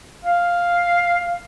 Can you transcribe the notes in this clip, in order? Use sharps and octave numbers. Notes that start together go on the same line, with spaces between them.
F5